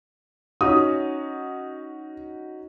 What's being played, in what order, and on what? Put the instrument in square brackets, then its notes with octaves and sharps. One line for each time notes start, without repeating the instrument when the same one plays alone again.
[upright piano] C#4 D#4 F#4 [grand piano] D#6